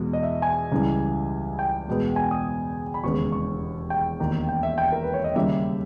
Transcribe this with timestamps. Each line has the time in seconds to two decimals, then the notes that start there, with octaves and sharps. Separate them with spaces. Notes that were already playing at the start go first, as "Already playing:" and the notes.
Already playing: E2 B2 G#3
0.13 D#5
0.23 E5
0.42 G#5
0.72 C#2 C#3 E3 G3
1.59 G5
1.87 E2 B2 G#3 B3
2.16 G#5
2.31 D#6
2.94 B5
3.03 E1 D#2 C#3 G#3 B3 C#6
3.32 C#6
3.90 G5
4.20 E1 D#2 D#3 A#3
4.49 G5
4.63 E5
4.78 G5
4.92 A#4
5.03 B4
5.14 C#5
5.24 D#5
5.35 D#2 C#3 G3 A#3 E5